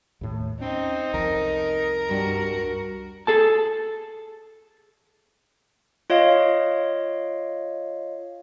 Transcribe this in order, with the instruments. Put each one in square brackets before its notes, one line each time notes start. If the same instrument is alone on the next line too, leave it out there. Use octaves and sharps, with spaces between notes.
[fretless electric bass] D#2 A2 A3
[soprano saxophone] C4 [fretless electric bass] C#4 [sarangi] D#4
[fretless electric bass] C2 F2 [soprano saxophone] A#4
[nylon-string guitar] G2 G3 [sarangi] F#4
[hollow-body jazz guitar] G#4 A4 A5
[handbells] F4 C#5 D#5 F5